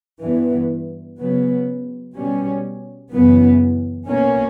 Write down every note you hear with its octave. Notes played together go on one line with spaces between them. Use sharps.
G2 E3 B3
C#3 F#3 B3
B2 G3 C#4
F#2 C#3 E3 B3
B2 A#3 C#4